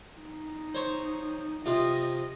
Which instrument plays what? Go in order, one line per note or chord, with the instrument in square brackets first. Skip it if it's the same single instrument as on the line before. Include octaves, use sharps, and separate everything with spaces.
[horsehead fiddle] D#4
[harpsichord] C5 C#5
[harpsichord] C3 F4 [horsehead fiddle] D#5